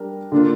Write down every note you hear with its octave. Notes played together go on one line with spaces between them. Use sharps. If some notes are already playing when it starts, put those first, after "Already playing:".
Already playing: G3 D4 A#4
D3 A#3 D4 F4